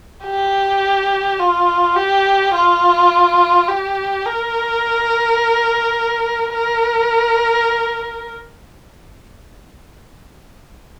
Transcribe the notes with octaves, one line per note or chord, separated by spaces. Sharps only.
G4
F4
G4
F4
G4
A#4
A#4